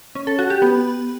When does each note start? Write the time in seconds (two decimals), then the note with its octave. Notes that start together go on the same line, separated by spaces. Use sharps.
0.15 C#4
0.27 A4
0.39 F#4
0.50 G4
0.62 B3